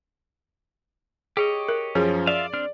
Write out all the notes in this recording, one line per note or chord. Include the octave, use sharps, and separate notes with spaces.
G4 G#4 C#5 D#5
A#4
F#2 F3 C#4 G#4
F4 D5 E5 F5
C4 D4 F6